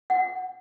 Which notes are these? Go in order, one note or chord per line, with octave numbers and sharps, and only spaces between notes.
F#5